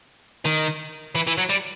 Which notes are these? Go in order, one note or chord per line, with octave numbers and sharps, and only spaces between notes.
D#3
E3
E3
F#3
G3